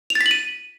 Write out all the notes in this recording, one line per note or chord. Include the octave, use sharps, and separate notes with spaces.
F7
A6
B6
F#7
D#7